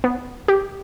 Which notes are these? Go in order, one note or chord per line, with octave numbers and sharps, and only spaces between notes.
B3
G4